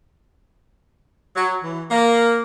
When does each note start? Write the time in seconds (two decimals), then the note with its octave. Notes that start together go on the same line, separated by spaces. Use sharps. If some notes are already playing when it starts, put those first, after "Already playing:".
1.36 F#3
1.63 E3
1.90 A#3